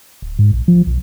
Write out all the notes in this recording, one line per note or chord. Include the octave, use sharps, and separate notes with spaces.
D1
G#2
A#1
F3
B1